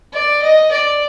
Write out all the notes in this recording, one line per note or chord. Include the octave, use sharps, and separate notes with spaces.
D5
D#5
D5